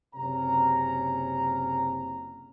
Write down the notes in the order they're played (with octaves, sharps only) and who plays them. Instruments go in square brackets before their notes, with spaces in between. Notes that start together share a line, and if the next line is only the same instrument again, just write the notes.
[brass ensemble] F#1 C3 C#4 A#5